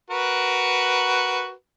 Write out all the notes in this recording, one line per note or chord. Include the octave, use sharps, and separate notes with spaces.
F#4 A#4 B4